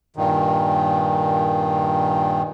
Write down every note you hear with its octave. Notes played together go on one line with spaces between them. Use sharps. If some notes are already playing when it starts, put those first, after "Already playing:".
G2 A#2 D#3